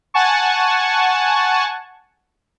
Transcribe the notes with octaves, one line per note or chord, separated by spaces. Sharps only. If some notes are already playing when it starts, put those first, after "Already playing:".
F#5 G#5 A5 C#6